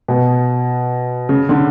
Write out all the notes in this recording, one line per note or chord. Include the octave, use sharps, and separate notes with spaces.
B2
C#3
D3